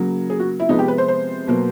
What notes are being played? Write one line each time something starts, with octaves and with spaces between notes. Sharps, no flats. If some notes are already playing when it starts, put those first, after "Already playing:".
Already playing: C#3 F#3 A#3
G#4
F#4
E4
C3 F3 G#3 B3 D#4
G4
B4
C5
C5
B2 F#3 A#3